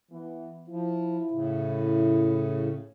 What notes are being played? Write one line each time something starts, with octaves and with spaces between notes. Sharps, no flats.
E3 B3
F3 E4
A2 C#3